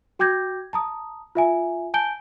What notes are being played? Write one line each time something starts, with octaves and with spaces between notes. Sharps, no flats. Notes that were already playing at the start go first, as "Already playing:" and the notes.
F#4 G5 D6 G6 G#6 A#6
A5 A#5 D#6
F4 E5 G#5
G#5 A5 G6 D7 G7